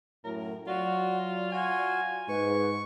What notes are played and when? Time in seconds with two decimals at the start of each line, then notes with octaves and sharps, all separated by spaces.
0.25 F#2 A2 A#4
0.67 F#3 F4 F#4 D5
1.52 F4 F#4 G#5
2.28 G#2 B4 C#6